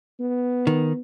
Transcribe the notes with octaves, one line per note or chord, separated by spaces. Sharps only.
B3
D#3